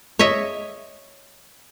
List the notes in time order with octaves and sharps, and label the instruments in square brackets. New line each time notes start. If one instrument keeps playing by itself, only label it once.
[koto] C#5 D#5 E5